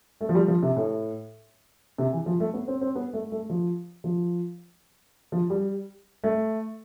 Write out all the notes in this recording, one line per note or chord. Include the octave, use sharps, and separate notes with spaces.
A3
F3
G3
F3
C3
A2
C3
E3
F3
A3
B3
C4
C4
B3
A3
A3
F3
F3
F3
G3
A3